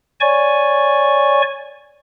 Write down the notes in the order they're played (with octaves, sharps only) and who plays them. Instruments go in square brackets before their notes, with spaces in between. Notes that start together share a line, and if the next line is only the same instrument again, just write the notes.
[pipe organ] C#5 D5 G#5 C#6